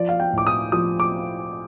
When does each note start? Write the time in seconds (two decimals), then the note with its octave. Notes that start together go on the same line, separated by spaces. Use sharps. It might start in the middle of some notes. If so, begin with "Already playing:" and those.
Already playing: F3 D5
0.09 F5
0.20 G5
0.33 A2 D6
0.47 D#6
0.72 F3 D#6
1.00 D6